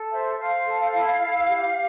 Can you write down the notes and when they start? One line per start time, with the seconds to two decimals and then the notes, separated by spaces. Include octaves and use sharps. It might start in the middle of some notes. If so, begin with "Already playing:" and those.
Already playing: A4
0.11 C5 E5
0.38 C5 F5
0.66 A4
0.93 E4
1.20 E4
1.48 G4